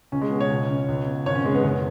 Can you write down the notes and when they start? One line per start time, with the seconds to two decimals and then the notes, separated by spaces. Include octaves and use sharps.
0.12 C#2 C#4
0.22 G#3
0.31 B2
0.40 C#5
0.50 C#2
0.69 C#3
0.88 C#2
1.07 B2
1.26 G#1 C#5
1.35 C#4
1.45 F#2 C#3 G#3
1.55 B3
1.64 F#1